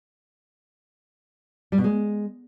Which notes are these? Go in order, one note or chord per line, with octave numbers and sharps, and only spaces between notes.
G3
B2
G#3